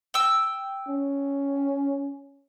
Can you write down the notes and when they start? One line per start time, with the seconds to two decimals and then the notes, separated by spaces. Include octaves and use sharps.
0.14 G5 E6
0.89 C#4